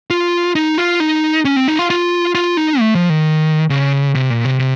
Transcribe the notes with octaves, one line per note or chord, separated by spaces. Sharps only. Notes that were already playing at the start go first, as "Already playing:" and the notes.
F4
D#4
F4
D#4
C#4
C4
D#4
F4
F4
F4
D#4
A3
F3
D#3
C#3
C3
A#2
C3
C3